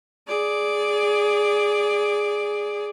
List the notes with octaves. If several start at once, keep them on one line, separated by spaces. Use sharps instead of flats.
G#4 D5